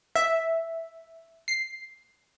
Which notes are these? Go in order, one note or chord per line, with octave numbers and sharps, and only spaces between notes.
E5
C7